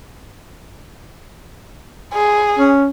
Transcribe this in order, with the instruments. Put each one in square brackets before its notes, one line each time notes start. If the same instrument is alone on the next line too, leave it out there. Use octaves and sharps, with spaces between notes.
[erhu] G#4
[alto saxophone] C#4